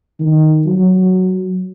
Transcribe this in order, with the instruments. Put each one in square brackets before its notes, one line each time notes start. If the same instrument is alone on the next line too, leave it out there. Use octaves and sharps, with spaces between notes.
[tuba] D#3
F#3